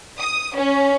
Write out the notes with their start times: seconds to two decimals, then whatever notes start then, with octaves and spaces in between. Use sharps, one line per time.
0.19 D#6
0.57 C#4